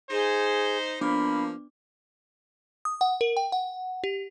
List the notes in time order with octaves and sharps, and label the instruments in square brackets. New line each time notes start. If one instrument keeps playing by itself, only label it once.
[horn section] D#4 C5 [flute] G#4
[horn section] F3 A#3 [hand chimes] B3 D4 D6 [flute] B5
[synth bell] D#6
F#5
A#4
G5
F#5
G4